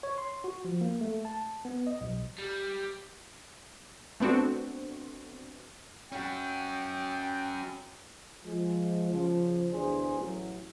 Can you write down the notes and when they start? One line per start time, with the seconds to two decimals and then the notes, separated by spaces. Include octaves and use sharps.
0.03 C#5
0.18 C6
0.44 F#4
0.65 F3
0.81 A#3
1.01 A3
1.25 A5
1.65 B3
1.87 D#5
2.01 B1
2.39 G3
4.20 A3 B3 C4 D4 F#4
6.12 C#4 F#4 G5
8.44 F3 G#3
9.12 C#3 F3
9.70 D2 B2 E3 D4 G#4 C5
10.17 A1 E3 F#3